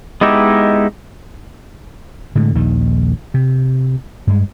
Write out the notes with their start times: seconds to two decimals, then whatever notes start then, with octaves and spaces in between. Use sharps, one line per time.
0.21 G#3 B3 D#4 E4 G4
2.35 A2 D3 G#3
2.55 A#1 D#2 D#3
3.34 C3
4.27 G2 G#3